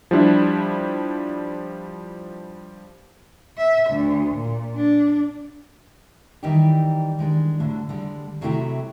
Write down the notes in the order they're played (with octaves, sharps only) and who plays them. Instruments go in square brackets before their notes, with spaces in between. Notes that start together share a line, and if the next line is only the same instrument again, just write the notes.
[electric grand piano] F3 G3 D4 E4
[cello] E5
D2
A#2
D4
[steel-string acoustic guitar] D#3 E3 G3 D#4 E4 G4
D#3 G#3 D4
A2 D3 F#3
D3 G3 G#3
C3 F#3 G#3 A3 E4 G4